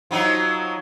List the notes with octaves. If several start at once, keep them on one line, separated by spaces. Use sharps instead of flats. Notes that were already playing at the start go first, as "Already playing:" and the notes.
F3 F#3 D#4